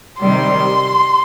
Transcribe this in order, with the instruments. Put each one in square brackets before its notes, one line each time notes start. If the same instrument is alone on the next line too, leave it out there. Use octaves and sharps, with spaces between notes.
[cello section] C3 D#3 G3 [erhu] C6